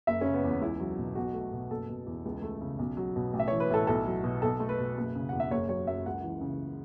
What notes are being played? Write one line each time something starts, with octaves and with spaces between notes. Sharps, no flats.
F#1 E5
C#3 C#4
B3
E2 B3
C#2 E4
F#3
B2
B1 F#4
A3
B2
F#1 A4
B2
E2
C#2
A3
C#3
B1
F#3
B2
A1
E5
E3 C#5
B4
A2 A4
B1 A4
F#3
B2
B1 A4
A3
B4
B2
F#1
C#3
E2 F#5
E5
F#1 C#5
F#3 C#5
F#2 E5
C#2 F#5
E3
C#3